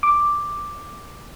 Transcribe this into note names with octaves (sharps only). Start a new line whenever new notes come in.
D6